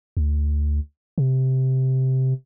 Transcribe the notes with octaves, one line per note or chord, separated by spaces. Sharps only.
D2
C3